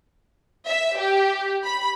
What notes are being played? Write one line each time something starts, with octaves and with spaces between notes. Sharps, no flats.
E5
G4
B5